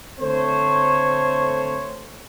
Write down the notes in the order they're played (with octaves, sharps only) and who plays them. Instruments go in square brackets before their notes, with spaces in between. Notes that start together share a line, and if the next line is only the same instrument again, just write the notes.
[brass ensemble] D3 A3 C4 A4 C5 C#5